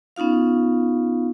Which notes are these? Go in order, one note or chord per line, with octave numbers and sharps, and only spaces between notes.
B3 C#4 D#4 F4 F5